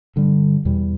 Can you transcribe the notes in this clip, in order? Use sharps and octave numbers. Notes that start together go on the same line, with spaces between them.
G2 D3 G3
E2 B2 G3